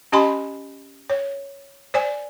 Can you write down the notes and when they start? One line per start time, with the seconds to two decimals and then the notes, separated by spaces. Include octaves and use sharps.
0.12 C#4 G4 D#5 G#5 B5 C6
1.10 C#5
1.94 C5 D5 G#5